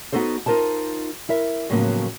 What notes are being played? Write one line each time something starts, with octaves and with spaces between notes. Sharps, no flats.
B3 D#4 F#4 A4 C5
D#4 F4 A#4 C5 A5
E4 A#4 E5
A2 C#3 F3 F#3 A#3 B3